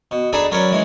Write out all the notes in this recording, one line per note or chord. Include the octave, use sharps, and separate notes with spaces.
B2
D4 D#4 G#4 A4 B4 D5
F#3 C#4 A#4 B4 C#5 D5
E3 G#3 C#4